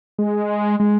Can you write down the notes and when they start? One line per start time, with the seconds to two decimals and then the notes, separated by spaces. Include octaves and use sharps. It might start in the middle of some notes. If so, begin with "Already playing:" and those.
0.19 G#3
0.80 G#3